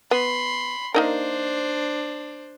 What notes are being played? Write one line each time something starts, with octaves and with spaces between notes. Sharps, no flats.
B3 B5 C6
A#3 D4 D#4 A#4 C5